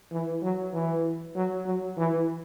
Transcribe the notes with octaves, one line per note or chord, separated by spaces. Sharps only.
E3
F#3
E3
F#3
F#3
E3